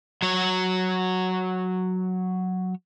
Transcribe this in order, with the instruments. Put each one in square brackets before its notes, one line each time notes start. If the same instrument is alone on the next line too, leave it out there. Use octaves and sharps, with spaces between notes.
[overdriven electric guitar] F#3 C#5